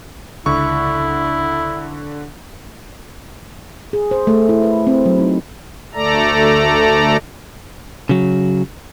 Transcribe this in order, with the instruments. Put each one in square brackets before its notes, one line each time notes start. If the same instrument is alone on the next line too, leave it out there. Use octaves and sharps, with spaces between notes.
[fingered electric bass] C#2 [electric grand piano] D3 C#6 [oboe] E4
[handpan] G#4
C5
A3
E4
B4
C4
F#3
D#4
[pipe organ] D2 A3 A4 D5 A#5
[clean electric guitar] C#3 F#3